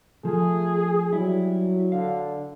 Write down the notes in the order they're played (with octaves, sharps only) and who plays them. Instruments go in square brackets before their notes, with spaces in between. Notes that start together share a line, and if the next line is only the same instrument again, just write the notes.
[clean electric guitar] F3 [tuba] A3 [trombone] G#4
[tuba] F#3 [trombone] G3 [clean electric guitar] E4
[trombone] D3 [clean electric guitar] F5